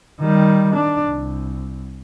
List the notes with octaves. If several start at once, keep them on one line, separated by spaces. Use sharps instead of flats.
D#3 G3
D4
C2